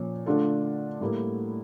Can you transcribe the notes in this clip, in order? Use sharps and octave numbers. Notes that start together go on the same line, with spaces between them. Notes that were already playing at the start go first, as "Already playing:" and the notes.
Already playing: A#2 F3 C#4
D3 A3 D4 F4 A4
A2 G3 A#3 E4